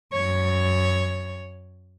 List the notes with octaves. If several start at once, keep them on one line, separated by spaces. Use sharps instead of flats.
F#2 C#5